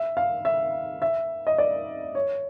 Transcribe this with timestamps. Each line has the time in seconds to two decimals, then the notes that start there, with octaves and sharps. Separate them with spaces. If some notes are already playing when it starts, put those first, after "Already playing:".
Already playing: E5
0.17 F5
0.45 E5
1.02 E5
1.47 D#5
1.58 D5
2.15 C#5